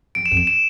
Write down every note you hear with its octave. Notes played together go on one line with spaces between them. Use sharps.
F2 D7
E7
F2
E7
E7